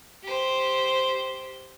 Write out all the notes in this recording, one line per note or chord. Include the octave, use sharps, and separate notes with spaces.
G4 C5